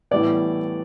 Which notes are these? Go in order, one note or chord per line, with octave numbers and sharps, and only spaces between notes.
A2 E3 G3 B3 D5